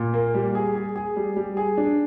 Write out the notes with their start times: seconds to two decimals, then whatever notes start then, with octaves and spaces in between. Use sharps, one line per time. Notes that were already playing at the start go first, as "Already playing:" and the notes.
Already playing: A#2
0.14 A#3
0.34 G3
0.55 G#4
0.75 G#4
0.96 G#4
1.16 G3
1.37 G3
1.57 G#4
1.78 D4